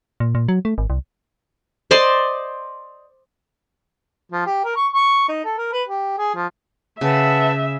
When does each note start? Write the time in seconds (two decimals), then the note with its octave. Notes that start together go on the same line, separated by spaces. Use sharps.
0.20 A#2
0.35 A#2
0.48 F#3
0.65 A3
0.78 G#1
0.90 C2
1.91 C5 D5 D#5 C6
4.32 F3
4.47 G4
4.65 A#4
4.76 C#6
4.94 C#6
5.29 D#4
5.45 A4
5.58 A#4
5.73 B4
5.88 G4
6.18 G#4
6.35 F3
7.01 C#3 B4 E5 F#5 A5